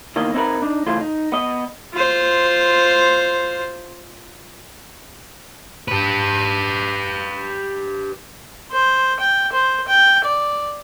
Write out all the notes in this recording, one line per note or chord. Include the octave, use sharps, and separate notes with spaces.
B2 D#3 E3 A#3 D#5
C4 D#4 E4 G4 A#4 B4
D4 D#4
C#2 E3 A3 E4 F4 C5
D#4
B3 D#5
F4 C5
G4 B4
C5
G5
C5
G5
D5